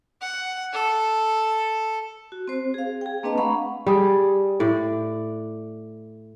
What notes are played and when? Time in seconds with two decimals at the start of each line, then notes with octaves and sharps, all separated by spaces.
0.21 F#5
0.73 A4
2.32 F#4
2.48 C4 C5
2.74 G#4 F5
3.01 G#4 G5
3.23 A#3 C4 D4 B4 D#5 A5
3.38 A3 F5 F#5 A#5 B5 C#6
3.87 G3 G#4
4.60 A2 D5